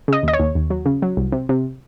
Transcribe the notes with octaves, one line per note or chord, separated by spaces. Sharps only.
C#3 D#5
D#2 D#5
C#5
D#2
D#2
F#3
C#3
F#3
C2
C3
C3